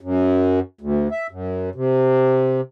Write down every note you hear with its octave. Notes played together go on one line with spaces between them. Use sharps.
F#2
D2
E5
F#2
C3